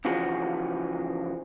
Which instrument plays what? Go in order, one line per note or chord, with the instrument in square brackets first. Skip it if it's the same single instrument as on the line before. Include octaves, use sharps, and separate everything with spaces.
[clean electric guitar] C#3 E3 F3 F#4 G#4